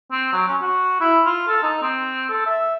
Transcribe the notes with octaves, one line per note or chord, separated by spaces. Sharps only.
C4
F#3
C#4
F#4
E4
F4
A4
D#4
C4
A4
E5